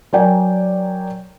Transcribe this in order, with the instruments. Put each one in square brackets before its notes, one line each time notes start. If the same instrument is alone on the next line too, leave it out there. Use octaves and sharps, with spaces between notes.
[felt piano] F#3 A#4 D5 G5 G#5